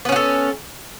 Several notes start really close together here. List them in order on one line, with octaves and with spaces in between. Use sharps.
B3 C#4 F#4 A4